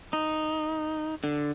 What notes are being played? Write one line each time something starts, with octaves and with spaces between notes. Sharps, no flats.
D#4
D3